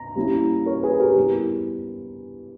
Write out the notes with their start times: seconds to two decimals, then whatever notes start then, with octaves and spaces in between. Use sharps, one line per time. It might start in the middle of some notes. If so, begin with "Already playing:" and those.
Already playing: A#5
0.16 G3 A#3 C#4 E4
0.66 A#4 C#5
0.83 G#4 B4
1.00 G4 A#4
1.16 G3 B3 E4